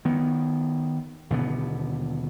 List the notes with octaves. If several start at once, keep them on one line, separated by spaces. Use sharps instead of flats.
D#3 B3
D#2 B2 D3 B3